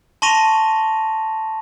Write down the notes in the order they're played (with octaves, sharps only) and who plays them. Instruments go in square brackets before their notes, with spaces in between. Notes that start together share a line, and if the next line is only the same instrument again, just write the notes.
[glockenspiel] A5 C6 C#6 A#6 D#7 F7